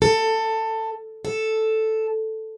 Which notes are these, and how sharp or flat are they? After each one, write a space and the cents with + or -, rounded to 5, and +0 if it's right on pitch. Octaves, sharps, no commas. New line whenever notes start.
A4 +15
A4 +0